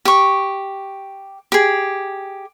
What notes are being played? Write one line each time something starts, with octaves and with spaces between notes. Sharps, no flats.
G4 C#6
G4 G#4